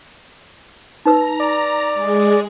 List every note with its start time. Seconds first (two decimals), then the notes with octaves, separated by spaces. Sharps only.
1.06 D#4 B4 A#5 E6
1.40 D5
1.94 G#3 G#4